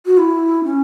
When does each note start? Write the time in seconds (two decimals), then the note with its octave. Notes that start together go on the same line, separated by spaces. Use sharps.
0.06 F#4
0.18 E4
0.65 C#4